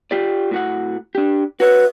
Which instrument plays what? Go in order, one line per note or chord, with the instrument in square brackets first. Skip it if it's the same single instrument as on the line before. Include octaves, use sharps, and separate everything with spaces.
[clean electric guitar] F4 G4 D5
A2 F#4 F#5
D4 G4
[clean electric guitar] F#4 C#5 E5 [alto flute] B4